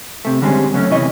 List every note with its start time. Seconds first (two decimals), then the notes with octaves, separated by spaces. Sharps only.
0.25 C3 A3
0.42 D3 G3 G#3 C4 C#4
0.73 C#3 F#3 A3 C#4
0.91 E2 C3 E4 C#5 D#5